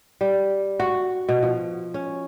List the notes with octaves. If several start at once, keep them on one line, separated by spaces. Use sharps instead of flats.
G3
F#4
B2
F3
C#4